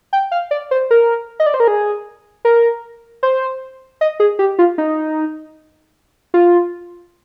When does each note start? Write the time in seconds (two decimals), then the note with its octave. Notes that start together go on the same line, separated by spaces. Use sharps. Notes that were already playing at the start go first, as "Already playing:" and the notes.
0.13 G5
0.31 F5
0.51 D5
0.71 C5
0.91 A#4
1.40 D#5
1.46 D5
1.54 C5
1.60 A#4
1.68 G#4
2.45 A#4
3.23 C5
4.01 D#5
4.20 G#4
4.39 G4
4.59 F4
4.78 D#4
6.34 F4